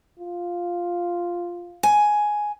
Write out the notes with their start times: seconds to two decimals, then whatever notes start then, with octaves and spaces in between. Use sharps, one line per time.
0.20 F4
1.83 G#5